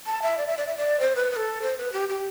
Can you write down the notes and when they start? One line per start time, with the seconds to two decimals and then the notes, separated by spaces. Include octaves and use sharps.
0.07 A5
0.22 E5
0.38 D5
0.47 E5
0.57 D5
0.67 E5
0.77 D5
1.00 C5
1.16 B4
1.31 B4
1.36 A4
1.62 C5
1.78 B4
1.93 G4
2.09 G4